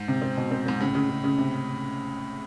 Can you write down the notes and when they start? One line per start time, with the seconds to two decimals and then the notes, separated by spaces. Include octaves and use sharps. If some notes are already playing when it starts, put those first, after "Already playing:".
Already playing: G#2
0.08 C3
0.22 C4
0.37 B2
0.51 C4
0.66 G#2 C4
0.80 A2 C#3
0.95 C#3
1.09 C#3
1.24 C#3
1.38 C3